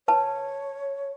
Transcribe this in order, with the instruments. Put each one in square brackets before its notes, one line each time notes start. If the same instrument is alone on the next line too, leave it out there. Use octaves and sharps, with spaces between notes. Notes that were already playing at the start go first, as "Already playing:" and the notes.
[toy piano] B4 A5 [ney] C#5